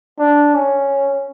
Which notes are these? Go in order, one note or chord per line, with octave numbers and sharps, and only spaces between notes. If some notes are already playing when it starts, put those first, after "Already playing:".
D4
C#4